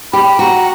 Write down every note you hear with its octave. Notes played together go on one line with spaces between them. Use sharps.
G4 B5
F#4 A#5